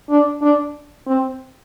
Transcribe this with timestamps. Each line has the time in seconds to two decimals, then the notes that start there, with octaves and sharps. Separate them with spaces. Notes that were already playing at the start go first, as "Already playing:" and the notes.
0.09 D4
0.42 D4
1.07 C4